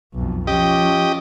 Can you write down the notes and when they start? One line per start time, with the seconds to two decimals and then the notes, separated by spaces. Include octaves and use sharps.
0.14 B1 F2
0.47 F3 C#4 G4 D#5